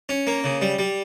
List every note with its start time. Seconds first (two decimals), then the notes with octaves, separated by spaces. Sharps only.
0.09 C#4
0.27 A#3
0.44 C#3
0.62 G3
0.79 G3